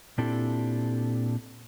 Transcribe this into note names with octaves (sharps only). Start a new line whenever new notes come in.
A#2 C4 D4 E4 G4 A4